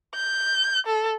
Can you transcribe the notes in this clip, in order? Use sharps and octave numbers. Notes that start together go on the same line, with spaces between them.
G6
A4